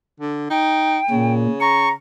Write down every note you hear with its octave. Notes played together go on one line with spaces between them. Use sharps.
D3
D#4 G5
A#2 C#3
A#5 C#6